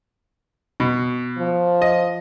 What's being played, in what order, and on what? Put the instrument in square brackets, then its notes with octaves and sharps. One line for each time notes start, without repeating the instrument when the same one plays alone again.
[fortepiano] B2
[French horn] F3
[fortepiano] D#5